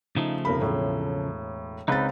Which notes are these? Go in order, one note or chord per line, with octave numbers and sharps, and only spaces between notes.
C#3 F3 A3 D#4
F1 A#4 B5
E1 A2
C#2 C4 D#4 B4 A6